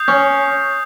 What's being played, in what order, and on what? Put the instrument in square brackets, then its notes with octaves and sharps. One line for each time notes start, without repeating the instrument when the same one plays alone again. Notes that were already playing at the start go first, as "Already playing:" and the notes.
Already playing: [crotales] D#6 G6 C7
[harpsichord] C#4